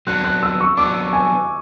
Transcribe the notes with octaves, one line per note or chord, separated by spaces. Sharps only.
F#3 B3 D4 F#6
F#6
E6
C#6
F#3 B3 D4 D6
G#5